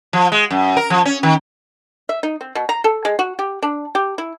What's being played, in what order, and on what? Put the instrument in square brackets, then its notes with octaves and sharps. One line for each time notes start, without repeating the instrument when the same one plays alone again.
[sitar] F3
G#3
F#2
A#4
F3
C#4
D#3
[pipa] E5
D#4
C4
B2
A#5
A4
G#3
F#4
G4
D4
G4
E4